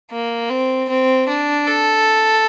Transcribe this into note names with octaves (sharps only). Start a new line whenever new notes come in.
A#3
C4
C4
D4
A4